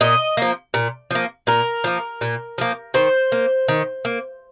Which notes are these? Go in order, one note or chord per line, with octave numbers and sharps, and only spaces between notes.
A#2 D#5
F3 A#3
A#2
F3 A#3
A#2 A#4
F3 A#3
A#2
F3 A#3
D#3 C5
A#3
D#3
A#3